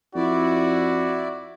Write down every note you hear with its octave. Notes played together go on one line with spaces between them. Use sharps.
F2 E4 F#4 D5